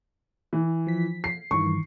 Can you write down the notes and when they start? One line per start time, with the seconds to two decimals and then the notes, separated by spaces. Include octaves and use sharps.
0.53 E3
0.87 F3 B6
1.24 C7
1.51 G2 D#3 E3 C#6